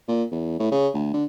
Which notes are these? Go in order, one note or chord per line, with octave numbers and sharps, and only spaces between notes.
A#2
E2
A2
C#3
D2
D3